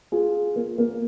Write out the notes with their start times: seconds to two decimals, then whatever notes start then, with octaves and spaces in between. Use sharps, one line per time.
0.12 F4 G#4
0.56 A#3
0.78 A#3